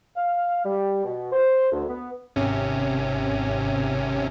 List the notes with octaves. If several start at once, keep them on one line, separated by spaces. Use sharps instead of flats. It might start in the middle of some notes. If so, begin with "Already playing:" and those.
F5
G3
B2
C5
D2
B3
G#1 C3 C#4